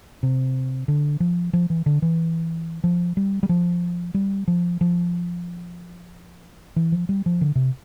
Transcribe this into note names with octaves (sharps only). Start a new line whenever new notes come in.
C3
D3
F3
F3
E3
D3
E3
F3
G3
G3
F3
G3
F3
F3
E3
F3
G3
F3
D3
C3